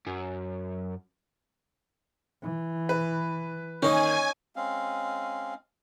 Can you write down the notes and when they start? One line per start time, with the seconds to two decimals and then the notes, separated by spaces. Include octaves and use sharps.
0.07 F#2
2.42 E3
2.89 B4
3.82 D#3 A#3 C#4 D#4 G#5
4.56 G#3 C4 C#4 F5